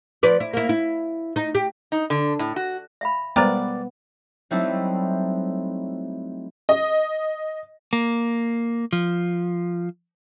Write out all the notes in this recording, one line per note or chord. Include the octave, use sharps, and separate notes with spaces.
F3 B4 D5
E4
A#3 E4
E4
D#4
G4
D#4
D3
A2
F#4
E5 F5 B5
G3 G#3 B3 G4 A#4 C5 D5
F#3 G3 A3 C4 D#4 E4
D#5
A#3
F3